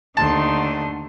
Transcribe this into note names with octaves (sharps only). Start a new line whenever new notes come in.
D#2 D3 A3 D#4 A5 C6